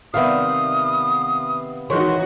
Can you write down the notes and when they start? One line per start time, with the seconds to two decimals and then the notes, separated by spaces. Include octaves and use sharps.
0.14 C3 D#3 G3 B3 E5 F5 D#6
1.90 D#3 E3 G#3 D#4 F#4 C#5 C6